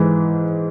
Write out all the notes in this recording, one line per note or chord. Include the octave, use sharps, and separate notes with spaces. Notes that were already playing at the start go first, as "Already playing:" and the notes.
Already playing: G#2 E3